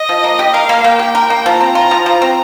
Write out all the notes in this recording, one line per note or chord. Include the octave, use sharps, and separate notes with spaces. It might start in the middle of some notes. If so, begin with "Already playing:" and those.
Already playing: D#5
F3
A#3
G4
A#4 F5
A#3
A#3 G5
G4
A#4
A#3
F3 A#5
C4
F4 A#5
F3
F3 A#5
C4